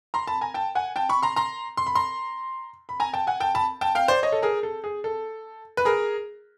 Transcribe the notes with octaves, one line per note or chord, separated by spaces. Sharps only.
A#5 C6
A5 B5
G#5 A#5
G5 A5
F#5 G#5
G5 A5
B5 C#6
A#5 C6
A#5 C6
C6
B5
A#5 C6
B5
G#5 A#5
G5 A5
F#5 G#5
G5 A5
A5 B5
G5 A5
F5 G5
C5 D5
C#5 D#5
A4
G#4 A#4
A4
G#4
A4
B4
G#4 A#4